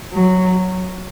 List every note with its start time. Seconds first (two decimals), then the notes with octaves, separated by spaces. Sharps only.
0.14 F#3